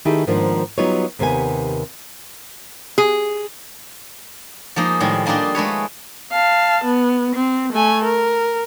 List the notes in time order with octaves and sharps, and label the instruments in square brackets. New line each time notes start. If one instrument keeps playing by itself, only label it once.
[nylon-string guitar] D#3 A3 D#4 E4 G4 G#4
G#2 D#3 F3 A#3 B3 D4
F#3 G3 B3 D#4 F4 C#5
D#2 C3 A#3 B3 G#5
[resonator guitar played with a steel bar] G#4
[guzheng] F3 G#3 A#3 D#4
A2 D#3 F3 G3 G#3
G3 A#3 D4 D#4 F4
G#3 A3 B4 C#5
[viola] F5 A5
B3
C4
A3 G#5
A#4